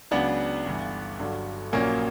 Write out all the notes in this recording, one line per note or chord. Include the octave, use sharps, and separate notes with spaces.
C#2 C#3 F#3 B3 D4
G1 G2 E3
G1 G2 D3 F#3
A#1 A#2 F#3 A#3 C#4